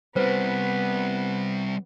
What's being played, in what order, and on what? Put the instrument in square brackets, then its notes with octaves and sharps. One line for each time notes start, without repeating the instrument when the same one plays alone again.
[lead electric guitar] G3 C4 [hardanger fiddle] B3 [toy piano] B4 C5